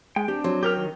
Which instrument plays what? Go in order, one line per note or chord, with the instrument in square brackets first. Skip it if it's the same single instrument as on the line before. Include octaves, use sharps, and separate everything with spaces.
[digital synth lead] G#3 [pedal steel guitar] G5
[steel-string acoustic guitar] C4 [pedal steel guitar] D4 [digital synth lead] G4
[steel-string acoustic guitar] F#3 [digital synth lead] C4
[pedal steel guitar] G4 A#4 F6 [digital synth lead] G5
[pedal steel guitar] D#3